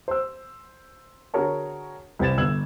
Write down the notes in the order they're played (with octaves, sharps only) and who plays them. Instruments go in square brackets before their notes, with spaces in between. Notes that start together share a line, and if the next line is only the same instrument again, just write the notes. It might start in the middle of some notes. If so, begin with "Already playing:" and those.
[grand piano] C5 E6
D3 F#4 G#4 A#4 C#5 A5
C2 E3 C5 G#6 A6 E7
G1 E6 G#6 E7 F#7